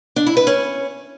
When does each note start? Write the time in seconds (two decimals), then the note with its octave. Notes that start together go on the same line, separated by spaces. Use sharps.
0.16 D4
0.26 E4
0.37 B4
0.47 C#4